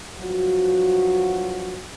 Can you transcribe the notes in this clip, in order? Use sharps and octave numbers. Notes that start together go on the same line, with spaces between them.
G2 F3 F#3 F#4